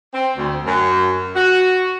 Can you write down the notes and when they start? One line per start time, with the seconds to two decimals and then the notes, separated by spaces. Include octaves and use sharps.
0.14 C4
0.37 D2
0.65 F#2
1.35 F#4